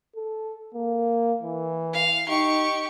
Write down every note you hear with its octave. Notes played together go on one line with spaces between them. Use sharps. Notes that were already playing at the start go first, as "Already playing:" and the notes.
A4
A#3
E3
F5
D#4 G4 C#6